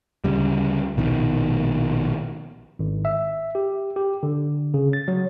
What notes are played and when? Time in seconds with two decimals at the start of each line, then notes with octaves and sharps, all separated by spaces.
0.24 D2 C#3 G3
0.97 A#1 B2 D#3
2.79 G#1
3.05 E5
3.55 G4
3.96 G4
4.23 D3
4.74 C#3
4.93 A6
5.08 F#3